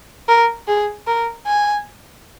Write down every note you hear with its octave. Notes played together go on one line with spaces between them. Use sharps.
A#4
G#4
A#4
G#5